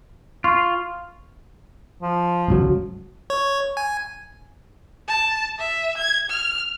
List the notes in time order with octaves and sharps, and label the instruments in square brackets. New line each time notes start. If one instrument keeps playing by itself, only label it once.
[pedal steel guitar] F4 [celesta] C6 C#6
[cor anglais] F3
[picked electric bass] G1 C#2 F#3
[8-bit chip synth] C#5
G#5
[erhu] A5
E5
G#6
F6